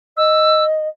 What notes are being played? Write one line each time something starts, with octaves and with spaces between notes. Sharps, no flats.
D#5 E6